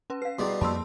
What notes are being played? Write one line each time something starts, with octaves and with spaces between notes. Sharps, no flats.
C#4 B4
B4 F5 C7
B2 G3 E4 G#4 C6
F2 A#3 A5 B5 C6 E6